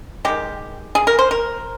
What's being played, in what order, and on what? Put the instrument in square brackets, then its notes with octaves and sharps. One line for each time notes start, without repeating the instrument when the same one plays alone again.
[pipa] D#3 G#3 G4
G#4
A#4
C5
A#4